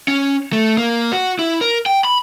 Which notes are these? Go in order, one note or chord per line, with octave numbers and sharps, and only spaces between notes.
C#4
A3
A#3
F#4
E4
A#4
G5
B5